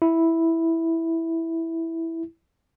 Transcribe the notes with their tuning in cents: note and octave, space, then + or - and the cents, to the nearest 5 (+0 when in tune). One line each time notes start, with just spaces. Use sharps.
E4 -5